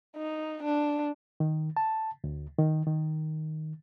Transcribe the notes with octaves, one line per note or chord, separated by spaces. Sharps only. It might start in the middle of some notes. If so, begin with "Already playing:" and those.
D#4
D4
D#3
A5
D2
D#3
D#3